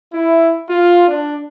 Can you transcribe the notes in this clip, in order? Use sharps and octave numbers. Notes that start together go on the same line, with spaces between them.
E4
F4
D4